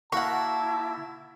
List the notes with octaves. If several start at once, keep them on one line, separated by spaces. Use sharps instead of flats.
A#3 E4 F#4 F#5 A5 C#6